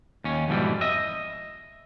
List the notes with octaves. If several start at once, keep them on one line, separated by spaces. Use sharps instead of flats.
D#2 C#4
F2 G#2 B2 E3 G3
D#5 E5